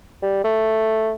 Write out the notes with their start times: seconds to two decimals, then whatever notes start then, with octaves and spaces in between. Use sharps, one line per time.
0.22 G3
0.44 A3